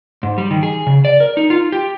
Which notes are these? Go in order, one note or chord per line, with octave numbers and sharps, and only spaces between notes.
G#2
G3
D#3
G#4
C#3
D5
A#4
D#4
F4
G4